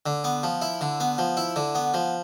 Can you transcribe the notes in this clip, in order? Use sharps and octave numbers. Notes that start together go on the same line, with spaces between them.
D3
B3
F3
E4
D3
B3
F3
E4
D3
B3
F3